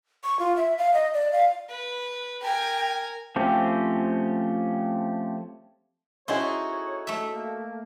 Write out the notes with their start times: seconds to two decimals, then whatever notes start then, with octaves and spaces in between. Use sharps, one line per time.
0.24 C#6
0.39 F4
0.56 E5
0.78 F5
0.94 D#5
1.14 D5
1.32 F5
1.69 B4
2.42 A#4 G5 G#5
3.36 F3 A3 C4 C#4 G4
6.28 C#4 D#4 E4 F#4 G#4 A4 C5 C#5
7.07 A3 E5
7.32 A#3